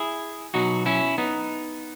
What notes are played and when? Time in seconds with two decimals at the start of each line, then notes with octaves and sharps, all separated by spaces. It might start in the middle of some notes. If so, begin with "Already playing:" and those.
Already playing: E4 G#4
0.54 B2 F#3 D#4 F#4
0.86 C#4 E4
1.18 B3 D#4